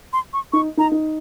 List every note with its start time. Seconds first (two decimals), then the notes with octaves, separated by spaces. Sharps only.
0.13 C6
0.33 C#6
0.53 D#4 C#6
0.77 D#4 A#5
0.91 D#4